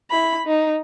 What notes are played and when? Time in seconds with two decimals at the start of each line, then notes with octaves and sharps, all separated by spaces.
0.10 E4 B5
0.47 D#4